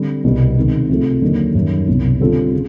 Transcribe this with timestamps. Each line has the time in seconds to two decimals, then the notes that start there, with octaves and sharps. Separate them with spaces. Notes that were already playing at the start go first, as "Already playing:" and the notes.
Already playing: D3 G3 C4
0.24 C2 B2 G3 B3
0.56 C#2 C3 D#3
0.89 C3 F3 A3
1.22 D#2 D3 F#3 A#3 D#4
1.55 F#2 D#3 G3
1.87 C2 B2 G3
2.20 D3 G3 C4 F4 A4
2.53 C#3